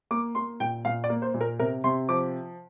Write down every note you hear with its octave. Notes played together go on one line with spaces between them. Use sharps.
A#3 D6
A#3 C6
A#2 G5
A#2 F5
D5
A#3
C5
A#2
A#4
C3 A#4
C3 C6
F3 D6